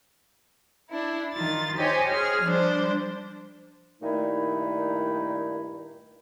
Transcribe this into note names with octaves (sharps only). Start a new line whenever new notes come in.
D4 E4
D#3 F4 A6
G4 C5 C#5 D#5 G5 G#5
G#4 F6
F3 G3 D4 C5
G2 A#2 D#3 A3 D#4 E4